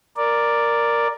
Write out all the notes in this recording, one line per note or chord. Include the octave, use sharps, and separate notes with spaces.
A#4 D5